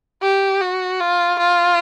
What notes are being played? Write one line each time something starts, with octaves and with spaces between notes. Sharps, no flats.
G4
F#4
F4
F4